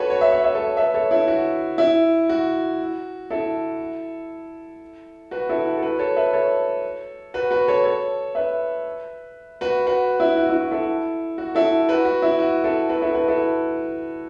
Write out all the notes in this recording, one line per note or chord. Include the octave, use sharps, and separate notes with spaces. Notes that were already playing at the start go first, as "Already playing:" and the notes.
Already playing: F#4 A4 B4 C#5
C#5
E5
C#5
E5
A4 C#5
B4 E5
A4 C#5
E4 A4
F#4
E4
F#4
E4 A4
F#4 B4
E4 A4
F#4
A4
F#4 B4
A4 C#5
B4 E5
A4 C#5
F#4 B4
F#4 B4
A4 C#5
A4 C#5
B4 E5
F#4 B4
F#4 B4
E4
F#4
E4
F#4
E4 A4
F#4
E4 A4
F#4 B4
F#4
E4
F#4
E4 A4
F#4 B4
E4 A4
F#4 B4
E4 A4